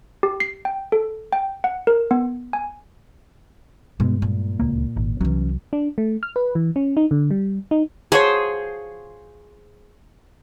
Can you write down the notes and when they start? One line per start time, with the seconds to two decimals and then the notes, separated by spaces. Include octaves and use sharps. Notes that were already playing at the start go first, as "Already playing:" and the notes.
0.23 G4
0.40 C7
0.65 G5
0.92 A4
1.33 G5
1.64 F#5
1.87 A#4
2.11 B3
2.53 G#5
4.00 G2 B2 G#3
4.22 A#2
4.60 D1 C#2 A#3
4.96 G#1
5.21 C2 E3 F#3 C#4
5.73 D4
5.98 A3
6.23 F6
6.36 B4
6.55 E3
6.76 C#4
6.97 D#4
7.11 D3
7.31 G3
7.71 D#4
8.12 F3 F#4 G#4 C5 C#5